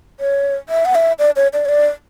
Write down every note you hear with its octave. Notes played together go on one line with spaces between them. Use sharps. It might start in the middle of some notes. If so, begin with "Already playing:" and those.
C#5
E5
F#5
E5
D5
C#5
D5
C#5
D5